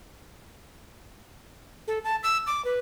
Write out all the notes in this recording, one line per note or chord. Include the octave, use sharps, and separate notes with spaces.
A4
A5
E6
D6
B4